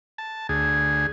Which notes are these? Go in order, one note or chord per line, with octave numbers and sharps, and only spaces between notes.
A5
D2 G#4